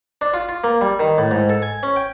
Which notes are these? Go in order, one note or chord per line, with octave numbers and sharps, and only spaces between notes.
D4
F4
F4
A#3
G3
D#3
A2
G#2
A4
G#5
C#4
G5